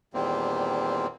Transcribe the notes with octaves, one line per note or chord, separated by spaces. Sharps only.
E2 A#2 D#3 G3 A#3 C4